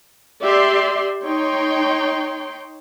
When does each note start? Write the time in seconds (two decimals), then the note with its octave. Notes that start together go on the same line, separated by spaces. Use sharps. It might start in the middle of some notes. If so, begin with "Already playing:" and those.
0.41 G4 D5 E5 C6
1.23 D#4 C#5 G5 C6